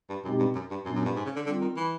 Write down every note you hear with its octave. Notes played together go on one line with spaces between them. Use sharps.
G2
F#2 B2 G#3 C4 D#4 G4
G2
F#2
G2
F#2 A#2 F#3 B3 D4
F#2
G2
G#2
C#3
D3
D3 G3 C4 F4
D#3
E3